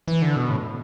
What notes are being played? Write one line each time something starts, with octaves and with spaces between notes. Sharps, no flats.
E3
D3
B2
A2